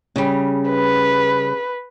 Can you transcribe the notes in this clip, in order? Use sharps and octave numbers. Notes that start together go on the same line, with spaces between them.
C#3 G3
B4